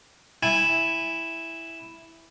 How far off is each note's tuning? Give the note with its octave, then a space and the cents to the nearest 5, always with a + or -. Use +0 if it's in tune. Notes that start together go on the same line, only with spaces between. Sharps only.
E4 +0 G#5 -20